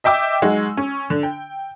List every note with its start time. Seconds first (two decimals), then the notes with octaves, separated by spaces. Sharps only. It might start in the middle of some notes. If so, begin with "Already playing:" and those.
0.04 D#5 E5 G5 D6 E6
0.42 F#3 G#3 D#4 F#4
0.77 C#4
1.10 D3
1.23 G5